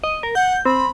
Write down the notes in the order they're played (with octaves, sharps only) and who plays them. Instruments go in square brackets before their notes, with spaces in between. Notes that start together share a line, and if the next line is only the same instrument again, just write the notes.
[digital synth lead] D#5
A#4
[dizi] F#5 [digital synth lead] G6
[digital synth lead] C4 [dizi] B5